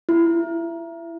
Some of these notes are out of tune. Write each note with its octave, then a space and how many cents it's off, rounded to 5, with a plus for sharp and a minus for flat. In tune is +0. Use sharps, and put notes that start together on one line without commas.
E4 +25